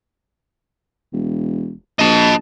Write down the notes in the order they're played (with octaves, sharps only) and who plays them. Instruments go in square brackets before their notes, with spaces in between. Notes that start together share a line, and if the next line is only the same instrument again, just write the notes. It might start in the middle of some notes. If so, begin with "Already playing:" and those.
[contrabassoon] E1
[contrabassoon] A#1 [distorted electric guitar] D#5 A5